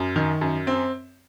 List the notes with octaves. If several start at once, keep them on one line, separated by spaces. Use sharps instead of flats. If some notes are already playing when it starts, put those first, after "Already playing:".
Already playing: F#2
D#3
F#2
C4